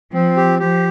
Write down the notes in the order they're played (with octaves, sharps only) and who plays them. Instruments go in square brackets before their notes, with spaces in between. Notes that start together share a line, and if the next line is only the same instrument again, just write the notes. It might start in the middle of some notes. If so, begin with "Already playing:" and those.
[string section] F3 [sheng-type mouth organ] C4
[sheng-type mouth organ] G4
[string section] F3 [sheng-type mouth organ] G4